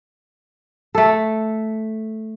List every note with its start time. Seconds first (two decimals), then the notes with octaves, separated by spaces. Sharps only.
0.95 A3 A4